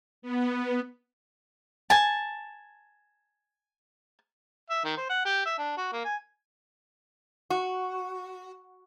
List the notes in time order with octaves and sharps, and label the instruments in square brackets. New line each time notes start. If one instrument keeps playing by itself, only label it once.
[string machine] B3
[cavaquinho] G#5 A5
[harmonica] E5
D#3
C5
F#5
G4
E5
D4
F#4
A#3
G#5
[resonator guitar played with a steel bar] F#4